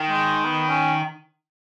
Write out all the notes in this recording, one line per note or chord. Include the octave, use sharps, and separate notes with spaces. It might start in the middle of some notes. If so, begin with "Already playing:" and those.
Already playing: D#3
G#3
B3
C#4